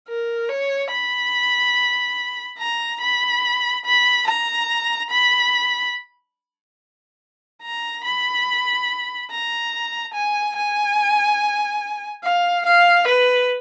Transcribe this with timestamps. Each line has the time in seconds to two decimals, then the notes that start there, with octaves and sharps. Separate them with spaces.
0.08 A#4
0.49 C#5
0.91 B5
2.58 A#5
3.01 B5
3.85 B5
4.27 A#5
5.10 B5
7.62 A#5
8.04 B5
9.30 A#5
10.14 G#5
10.56 G#5
12.24 F5
12.66 F5
13.07 B4